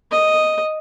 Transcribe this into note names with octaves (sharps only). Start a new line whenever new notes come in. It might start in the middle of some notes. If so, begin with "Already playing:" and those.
D#5